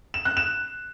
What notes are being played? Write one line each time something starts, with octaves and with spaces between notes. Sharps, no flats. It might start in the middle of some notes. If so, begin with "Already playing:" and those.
E7
F#6
E7